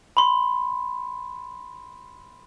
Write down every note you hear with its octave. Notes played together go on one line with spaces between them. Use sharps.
B5 C6